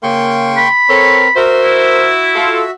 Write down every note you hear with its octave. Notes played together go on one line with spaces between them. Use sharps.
C#3 A#3 G5 C6 C#6
B5
C4 A4 A#4 C#5
F#4 A#4 C5 E5
E4
F4 A4